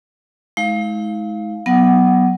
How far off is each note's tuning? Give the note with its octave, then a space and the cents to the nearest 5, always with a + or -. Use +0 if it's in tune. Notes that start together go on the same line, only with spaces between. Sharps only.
G#3 +30 E4 -45 F5 +0
F#3 +5 B3 +0 F#5 +20